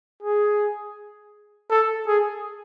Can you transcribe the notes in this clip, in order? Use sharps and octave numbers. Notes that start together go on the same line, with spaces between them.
G#4
A4
G#4